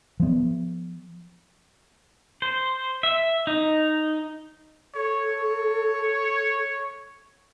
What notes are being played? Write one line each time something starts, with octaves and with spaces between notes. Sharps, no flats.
F3 B3
C5
E5
D#4
A4 C#5